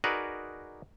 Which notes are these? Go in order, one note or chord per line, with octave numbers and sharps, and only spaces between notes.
D#4 F#4 G#4 A#4 B4 D5